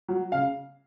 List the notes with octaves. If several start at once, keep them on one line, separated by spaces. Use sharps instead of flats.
F#3
C#3 F5